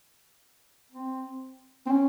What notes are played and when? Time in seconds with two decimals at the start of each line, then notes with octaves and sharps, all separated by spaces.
0.92 C4
1.86 C4
1.90 C#4